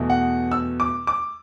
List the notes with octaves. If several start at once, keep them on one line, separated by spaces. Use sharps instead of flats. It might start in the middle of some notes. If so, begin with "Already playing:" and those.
Already playing: E2 B2 A3
F#5
E6
D6
D6